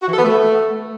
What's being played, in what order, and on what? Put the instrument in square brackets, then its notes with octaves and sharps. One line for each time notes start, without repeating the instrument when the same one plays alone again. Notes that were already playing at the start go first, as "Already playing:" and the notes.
[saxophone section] F#4
E3
A4
B3
A3